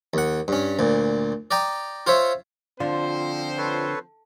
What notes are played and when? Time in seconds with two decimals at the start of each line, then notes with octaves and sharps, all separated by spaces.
0.14 D#2 F#5
0.48 G2 C#4
0.79 D2 A#2
1.51 D5 D#5 G5 A#5
2.07 F4 C5 C#5 E5
2.80 D3 F3 C4 F4 C5 D5
3.58 A4 B4 C#5